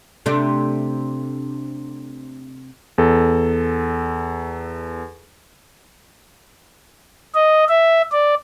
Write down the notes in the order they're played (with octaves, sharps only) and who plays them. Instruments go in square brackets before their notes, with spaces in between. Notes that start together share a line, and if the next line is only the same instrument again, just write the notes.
[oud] C3 A3 D4
[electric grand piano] E2 A4
[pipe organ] D#5
E5
D5